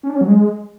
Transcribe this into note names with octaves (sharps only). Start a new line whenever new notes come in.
C#4
D4
C#4
F#3
G#3